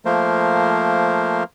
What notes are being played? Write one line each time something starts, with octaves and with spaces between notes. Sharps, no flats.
F3 A3 A#3 A#4 C5